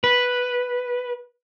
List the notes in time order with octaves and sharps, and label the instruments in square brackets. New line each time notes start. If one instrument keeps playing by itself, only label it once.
[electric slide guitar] B4